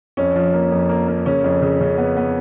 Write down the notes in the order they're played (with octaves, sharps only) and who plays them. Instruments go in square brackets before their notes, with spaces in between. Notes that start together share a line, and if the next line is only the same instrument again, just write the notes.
[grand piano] F2 C#4
F3
A#3
F2
A#3
A#3
C#3 C#4
F2
C#3
C#3
B3
B3